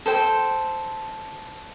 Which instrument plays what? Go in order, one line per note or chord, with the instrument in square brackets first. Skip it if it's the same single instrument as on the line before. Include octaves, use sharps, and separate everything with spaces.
[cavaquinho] A4 C5 G5